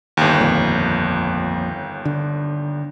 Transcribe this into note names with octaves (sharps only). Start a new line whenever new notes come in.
G1 D#2
A#1 F2 A#2
D3